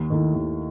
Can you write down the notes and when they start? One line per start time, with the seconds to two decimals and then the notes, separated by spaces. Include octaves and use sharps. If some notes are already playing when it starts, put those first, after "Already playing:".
Already playing: D#2
0.10 D#3 A3 E4
0.34 D#2